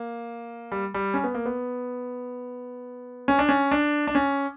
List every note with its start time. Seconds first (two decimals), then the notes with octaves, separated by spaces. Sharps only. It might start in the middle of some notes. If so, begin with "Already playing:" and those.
Already playing: A#3
0.72 G3
0.94 G3
1.14 C#4
1.24 B3
1.35 A#3
1.45 B3
3.28 C#4
3.39 D4
3.49 C#4
3.72 D4
4.07 D4
4.15 C#4